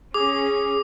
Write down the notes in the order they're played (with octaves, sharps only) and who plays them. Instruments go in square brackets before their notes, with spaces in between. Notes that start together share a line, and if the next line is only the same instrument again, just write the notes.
[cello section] C#4 [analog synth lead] G#4 [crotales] D6